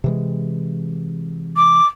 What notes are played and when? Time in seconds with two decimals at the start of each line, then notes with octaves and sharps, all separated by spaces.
0.04 C3 E3 G#3
1.56 D6